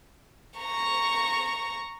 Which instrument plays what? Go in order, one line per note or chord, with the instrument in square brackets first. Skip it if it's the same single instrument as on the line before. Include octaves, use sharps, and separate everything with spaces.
[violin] A#5 C#6